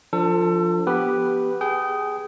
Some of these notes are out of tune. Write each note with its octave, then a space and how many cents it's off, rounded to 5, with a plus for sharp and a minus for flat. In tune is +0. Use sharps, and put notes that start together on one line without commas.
F3 +0 D4 +0 A4 +30
B3 +0 G4 +0 B4 +0
G#4 +0 G5 -30